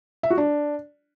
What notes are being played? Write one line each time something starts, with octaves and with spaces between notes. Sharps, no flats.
E5
F#4
D4